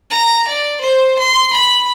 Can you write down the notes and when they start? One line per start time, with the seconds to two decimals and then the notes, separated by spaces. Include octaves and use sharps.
0.10 A#5
0.48 D5
0.81 C5
1.19 C6
1.53 B5